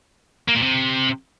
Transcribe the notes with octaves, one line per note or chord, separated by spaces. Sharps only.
A#3
A#2
C3